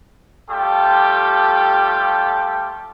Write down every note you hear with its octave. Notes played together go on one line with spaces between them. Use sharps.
G3 A3 F4 G4 A4